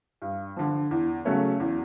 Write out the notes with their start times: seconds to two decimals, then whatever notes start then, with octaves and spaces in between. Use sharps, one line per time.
0.22 G2
0.56 D3 F3
0.91 E2
1.25 C#3 F#3 A3 C#4
1.60 E2